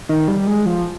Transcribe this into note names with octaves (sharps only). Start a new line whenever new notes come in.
D#3
G3
G#3
F3